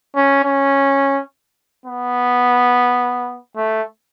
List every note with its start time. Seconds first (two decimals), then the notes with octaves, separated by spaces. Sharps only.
0.16 C#4
0.44 C#4
1.86 B3
3.56 A3